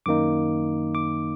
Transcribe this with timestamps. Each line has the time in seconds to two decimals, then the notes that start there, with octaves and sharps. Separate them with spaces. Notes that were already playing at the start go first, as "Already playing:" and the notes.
0.06 F#2 D#3 A#3 D#4 D6
0.95 D6